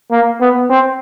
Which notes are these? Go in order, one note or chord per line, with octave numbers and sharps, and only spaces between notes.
A#3
B3
C4